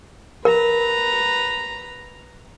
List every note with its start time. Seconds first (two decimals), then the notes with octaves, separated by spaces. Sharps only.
0.45 A#4 B4 A#5